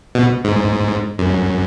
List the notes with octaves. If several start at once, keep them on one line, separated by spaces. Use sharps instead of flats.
B2
G#2
F#2